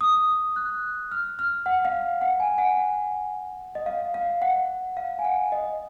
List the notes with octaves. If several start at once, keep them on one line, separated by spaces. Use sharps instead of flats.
D#6
F#6
F6
F6
F#5
F5
F#5
G#5
F#5
F#5
D#5
F5
F5
F#5
F5
G#5
F#5
D#5